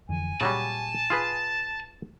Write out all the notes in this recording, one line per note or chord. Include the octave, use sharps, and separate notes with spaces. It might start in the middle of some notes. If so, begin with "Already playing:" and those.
F2 D3 E3 G#5
A#2 C#3 F#3 G3 A5
F4 G#4 B4